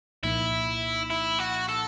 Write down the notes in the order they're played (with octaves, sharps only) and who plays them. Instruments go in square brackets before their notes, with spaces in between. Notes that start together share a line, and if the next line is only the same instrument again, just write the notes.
[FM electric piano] C2 A#2 F3 A#3 D#4 [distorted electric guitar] E4
[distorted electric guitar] E4
F#4
A4